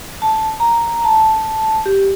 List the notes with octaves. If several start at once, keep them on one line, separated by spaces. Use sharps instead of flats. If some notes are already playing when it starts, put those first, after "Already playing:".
A5
A#5
A#5
A5
G4